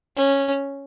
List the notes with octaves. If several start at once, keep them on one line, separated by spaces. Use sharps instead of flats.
C#4